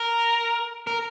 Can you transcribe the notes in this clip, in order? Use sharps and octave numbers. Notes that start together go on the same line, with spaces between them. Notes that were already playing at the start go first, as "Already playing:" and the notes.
Already playing: A#4
A#4